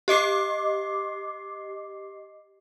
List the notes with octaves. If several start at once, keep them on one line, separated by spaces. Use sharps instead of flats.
G4 D#5 D6 C7